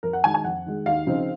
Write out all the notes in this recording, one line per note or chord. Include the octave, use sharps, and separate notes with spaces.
F2 A#4
F#5
D#3 G#3 G#5
G#5
F2 F#5
D#3 G#3
D#2 F5
C#3 F3 C4 D#4